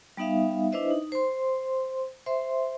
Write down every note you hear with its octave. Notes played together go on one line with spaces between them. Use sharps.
G3 B3 D#4 E5 F5
D4 E4 B4 C5 D#5 E5
D#4
C5 C6
C5 E5 C6